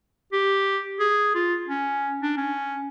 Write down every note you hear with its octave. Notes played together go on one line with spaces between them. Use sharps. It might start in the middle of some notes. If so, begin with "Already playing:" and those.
G4
G#4
F4
C#4
D4
C#4